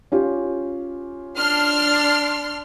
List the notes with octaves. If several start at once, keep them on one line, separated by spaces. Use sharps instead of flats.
C#4 F4 G4
D4 C6 F6